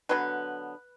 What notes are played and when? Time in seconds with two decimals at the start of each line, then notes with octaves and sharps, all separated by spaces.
0.09 D3 F#3 B3 B4